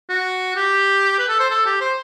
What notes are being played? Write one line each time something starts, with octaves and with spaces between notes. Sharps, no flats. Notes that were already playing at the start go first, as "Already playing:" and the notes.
F#4
G4
B4
A4
C5
A4
G4
C5